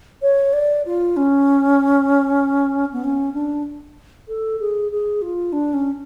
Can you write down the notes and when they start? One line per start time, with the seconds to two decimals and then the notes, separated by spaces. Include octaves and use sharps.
0.22 C#5
0.53 D5
0.86 F4
1.17 C#4
2.93 B3
3.04 C#4
3.34 D4
4.28 A4
4.60 G#4
4.91 G#4
5.22 F4
5.53 D4
5.73 C#4